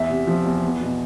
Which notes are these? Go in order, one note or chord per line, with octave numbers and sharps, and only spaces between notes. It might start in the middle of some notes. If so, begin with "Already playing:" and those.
Already playing: E2 E5
C3
F3
E2
B3
B2